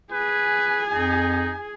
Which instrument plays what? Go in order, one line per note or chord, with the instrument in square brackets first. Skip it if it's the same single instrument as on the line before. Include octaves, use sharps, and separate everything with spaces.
[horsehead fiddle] G#4 G#5 [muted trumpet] B4
[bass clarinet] F2 [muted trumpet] D#4